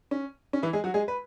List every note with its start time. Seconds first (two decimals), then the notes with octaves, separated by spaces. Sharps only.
0.11 C#4
0.53 C#4
0.62 E3 E4
0.73 G#3 G#4
0.84 F#3 F#4
0.94 G#3 G#4
1.08 B4